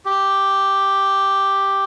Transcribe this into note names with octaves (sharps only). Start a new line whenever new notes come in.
G4